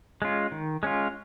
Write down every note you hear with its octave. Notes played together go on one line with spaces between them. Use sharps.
G#3 C#4 F4
D#3
G#3 C#4 F4